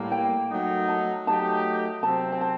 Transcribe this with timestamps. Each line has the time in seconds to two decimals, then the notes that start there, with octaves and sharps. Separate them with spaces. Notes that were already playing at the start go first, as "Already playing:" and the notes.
Already playing: A2 G3 A#3
0.12 G5
0.50 F#3 A3 D#4
0.89 A5
1.27 F#3 A3 D#4 G4 A5
2.03 C3 F#3 C4 A5
2.32 G5
2.41 A5